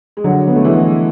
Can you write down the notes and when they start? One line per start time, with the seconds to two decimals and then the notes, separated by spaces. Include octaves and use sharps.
0.17 G#3
0.24 D3 F#3
0.48 B3
0.56 A3
0.65 E3 G#3